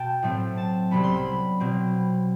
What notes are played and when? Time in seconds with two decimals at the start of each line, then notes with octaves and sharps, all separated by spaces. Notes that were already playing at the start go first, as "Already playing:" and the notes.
Already playing: B2 G5 A5
0.23 A2 F#3 A3 C4
0.57 A5
0.91 C2 C3 F#3 B3 B5
1.04 C6
1.15 B5
1.60 B2 F#3 C4